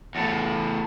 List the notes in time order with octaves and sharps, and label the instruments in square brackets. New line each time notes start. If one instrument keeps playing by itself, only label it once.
[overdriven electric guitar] E2 A2